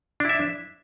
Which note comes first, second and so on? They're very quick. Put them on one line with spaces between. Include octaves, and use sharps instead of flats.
D4 E4 E5